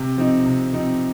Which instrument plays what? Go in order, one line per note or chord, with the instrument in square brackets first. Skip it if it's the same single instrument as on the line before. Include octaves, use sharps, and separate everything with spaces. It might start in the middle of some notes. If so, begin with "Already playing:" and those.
Already playing: [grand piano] C3
F3 C4 D#4
C3
F3 C4 D#4